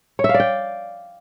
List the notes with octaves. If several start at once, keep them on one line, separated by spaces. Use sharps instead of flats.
C#5
E5
F5
D5
G5